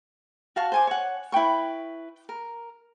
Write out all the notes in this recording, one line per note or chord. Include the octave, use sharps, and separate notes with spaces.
F#4 F5 A5 C#6
C5 G#5 D6
C#5 F#5
E4 B4 G5 C#6
A#4